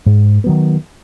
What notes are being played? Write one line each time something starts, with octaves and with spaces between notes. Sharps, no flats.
G#2
D#3 F#3 B3